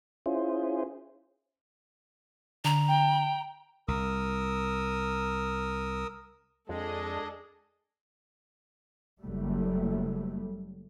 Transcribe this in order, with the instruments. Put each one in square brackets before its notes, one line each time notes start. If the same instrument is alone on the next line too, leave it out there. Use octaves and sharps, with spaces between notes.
[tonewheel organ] C#4 E4 F4 G#4 C5
[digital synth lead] D3 [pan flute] A#5
[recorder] G5
[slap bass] C2 [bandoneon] A#4 D#6 E6
[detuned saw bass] F2 [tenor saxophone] G#3 [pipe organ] D4 G#4 D#5 [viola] A4
[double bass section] F#1 F#3 G3 A3